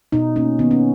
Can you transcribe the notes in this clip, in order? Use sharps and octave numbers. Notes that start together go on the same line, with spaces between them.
B2 D#4
A#3 C#4
D#3 B3
C#4